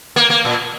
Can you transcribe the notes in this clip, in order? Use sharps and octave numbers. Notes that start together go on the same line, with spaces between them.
A#3
A#3
A#2